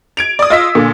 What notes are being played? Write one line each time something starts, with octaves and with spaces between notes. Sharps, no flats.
G#6 D7 F7
D5 D#6
F4 D#5 E6 B6
A#2 D3 A#3